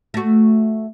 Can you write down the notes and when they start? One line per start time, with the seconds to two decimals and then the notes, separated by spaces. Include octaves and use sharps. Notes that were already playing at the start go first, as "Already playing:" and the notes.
0.14 A3 F#4